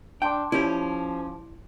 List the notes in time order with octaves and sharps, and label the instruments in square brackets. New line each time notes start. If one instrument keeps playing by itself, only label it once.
[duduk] D4 [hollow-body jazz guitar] G5 [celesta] A5 C6 D6
[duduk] F3 [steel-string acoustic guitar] C#4 [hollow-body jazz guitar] E4 G4